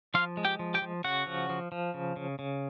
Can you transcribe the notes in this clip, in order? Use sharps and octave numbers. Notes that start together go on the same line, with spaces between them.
F3 F4 F5
G#3
G4 G5
F3
G4 G5
F3
C#3 F#4 F#5
F3
F3
F3
C#3
C#3
C#3